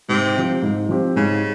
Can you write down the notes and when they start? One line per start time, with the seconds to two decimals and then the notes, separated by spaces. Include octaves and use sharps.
0.09 G#2 C3
0.36 F3 C4 G4
0.62 G#2
0.89 F3 C4 G4
1.16 G#2 C#3